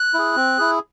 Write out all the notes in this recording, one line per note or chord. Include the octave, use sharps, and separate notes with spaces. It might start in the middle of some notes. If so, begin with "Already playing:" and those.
Already playing: F#6
E4 G#4
C4
E4 G#4